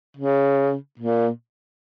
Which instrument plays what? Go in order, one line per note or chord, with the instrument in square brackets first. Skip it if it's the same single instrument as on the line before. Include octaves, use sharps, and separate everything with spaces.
[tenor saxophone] C#3
A#2